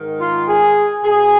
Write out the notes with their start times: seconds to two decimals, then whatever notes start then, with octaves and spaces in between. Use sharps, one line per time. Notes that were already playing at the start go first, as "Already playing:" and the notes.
Already playing: G#2 D#3
0.19 F4
0.47 G#4
1.03 B2 G#4